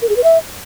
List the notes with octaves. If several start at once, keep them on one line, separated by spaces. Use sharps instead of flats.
A#4
G#4
B4
E5